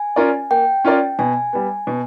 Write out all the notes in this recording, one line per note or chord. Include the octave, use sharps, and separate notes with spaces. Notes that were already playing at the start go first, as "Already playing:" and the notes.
Already playing: G#5
C#4 F4 A#4 D5
A#3 G5
C#4 F4 A#4 D5
B2 G#5
G3 B3
B2